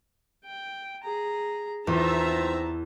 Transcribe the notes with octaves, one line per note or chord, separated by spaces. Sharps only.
G5
G#4 A#5
E2 C4 D#4 F4 E5 A5 A#5